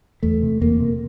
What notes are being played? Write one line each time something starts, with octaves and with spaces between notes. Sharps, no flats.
E2 A3
C3
E2 A#3
C3